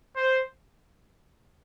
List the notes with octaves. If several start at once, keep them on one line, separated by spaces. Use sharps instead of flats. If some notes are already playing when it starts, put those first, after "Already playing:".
C5